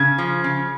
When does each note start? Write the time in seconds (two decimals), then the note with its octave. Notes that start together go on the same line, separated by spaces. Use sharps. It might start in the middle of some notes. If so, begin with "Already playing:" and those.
Already playing: C#3 G#6
0.18 F3
0.44 C#3